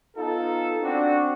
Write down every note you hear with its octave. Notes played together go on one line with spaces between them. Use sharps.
B3 D#4 F4 A4
C4 D4 F#4